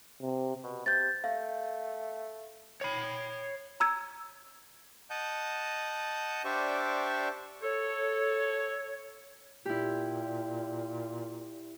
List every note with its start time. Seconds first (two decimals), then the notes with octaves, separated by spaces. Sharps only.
0.22 C3
0.64 B2
0.86 C3 G6 A6
1.24 A3 F5
2.81 C#5 B5
3.80 A#5 E6 G#6
5.10 D#5 F#5 A5 G6
6.45 D4 G4 C5 D5 E5 C#6
7.62 A4 C#5
9.65 A#2 E4 G4